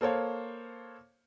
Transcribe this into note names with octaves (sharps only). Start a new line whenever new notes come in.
A#3 A4 C5 C#5 F5